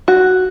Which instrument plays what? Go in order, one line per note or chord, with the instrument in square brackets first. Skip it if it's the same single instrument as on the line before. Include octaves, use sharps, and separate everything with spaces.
[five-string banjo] F#4